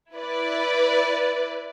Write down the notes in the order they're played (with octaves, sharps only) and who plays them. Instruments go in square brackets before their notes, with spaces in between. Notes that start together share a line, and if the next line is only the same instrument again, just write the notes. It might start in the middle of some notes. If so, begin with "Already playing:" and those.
[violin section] E4 B4 D5